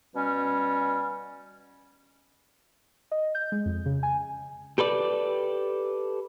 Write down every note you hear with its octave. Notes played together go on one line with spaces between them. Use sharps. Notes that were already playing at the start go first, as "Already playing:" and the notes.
B2 G3 C#4
D#5
G6
G#3
F2
C#3
G#5
G4 A4 B4 D5